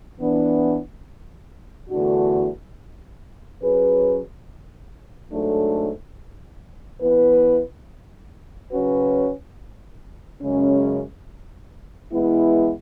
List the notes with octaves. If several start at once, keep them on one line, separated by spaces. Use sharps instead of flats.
E3 B3 D4
E2 D3 A3 D4 F#4
F#3 C#4 G#4 B4
G#2 F#3 A3 D4 A4
E3 B3 E4 B4
C#3 F#3 C#4 F#4 B4
F#2 C#3 G#3 C#4
E3 G#3 B3 E4